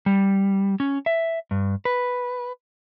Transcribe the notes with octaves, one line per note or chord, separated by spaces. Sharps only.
G3
C#4
E5
G2
B4